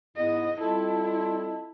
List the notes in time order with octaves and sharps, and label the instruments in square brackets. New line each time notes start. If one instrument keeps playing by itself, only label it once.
[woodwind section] G#2 B3 E4 [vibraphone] G#4 [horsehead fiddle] D#5
[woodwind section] G3 C4 F4 [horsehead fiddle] E4 [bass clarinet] A4 [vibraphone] D#5 A5